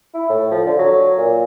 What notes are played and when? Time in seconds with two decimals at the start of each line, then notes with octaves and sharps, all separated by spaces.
0.14 E4
0.29 A2
0.51 F3
0.66 D3
0.79 F#3
1.18 A#2